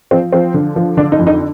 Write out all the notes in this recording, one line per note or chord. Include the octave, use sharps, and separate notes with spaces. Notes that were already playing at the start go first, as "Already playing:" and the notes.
F3 C4
F3 C4
D3
F3
D3 D4
D#4
F2
D#4